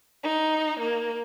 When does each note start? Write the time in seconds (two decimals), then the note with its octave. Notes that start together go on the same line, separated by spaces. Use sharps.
0.23 D#4
0.79 A#3